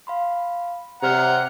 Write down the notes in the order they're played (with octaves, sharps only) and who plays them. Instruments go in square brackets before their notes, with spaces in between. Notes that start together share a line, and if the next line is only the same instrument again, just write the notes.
[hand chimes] F5 B5 C6
[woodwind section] C3 [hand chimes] D5 F6 [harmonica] F#5 A#5